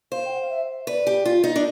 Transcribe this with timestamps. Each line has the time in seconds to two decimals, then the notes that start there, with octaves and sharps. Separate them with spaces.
0.11 C5 F5
0.25 G5
0.33 F#5
0.41 F5
0.49 E5
0.87 B4 D5
1.07 G4
1.25 F4
1.44 D#4
1.56 D4